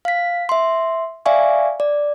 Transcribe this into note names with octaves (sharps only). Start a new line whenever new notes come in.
F5 B6
E5 C6
D5 E5 F5 G#5 C#6
D5